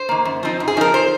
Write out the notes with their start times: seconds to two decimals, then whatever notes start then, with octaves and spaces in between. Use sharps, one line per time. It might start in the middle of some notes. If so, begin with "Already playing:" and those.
Already playing: C5
0.09 D#3 A#3
0.25 F#2
0.43 F3 C4 D#4
0.60 F#2
0.68 G#4
0.77 F3 C4 D#4 A#4
0.94 C5